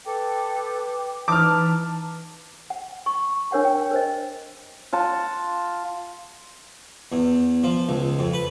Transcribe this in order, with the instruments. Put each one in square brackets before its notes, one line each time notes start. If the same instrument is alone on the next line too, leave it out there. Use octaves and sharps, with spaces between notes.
[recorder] A4 [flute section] B4 G5 D6
[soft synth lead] E3 [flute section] D#4 B4 A#5 [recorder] A5 [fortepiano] D6 F6
[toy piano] F#5
C#6
D4 A#4 C#5 F#5 A#5
G5
A#4 C5 D#5
[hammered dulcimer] F4 F#5 A5
[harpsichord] E2
F3
C#2
F2
B4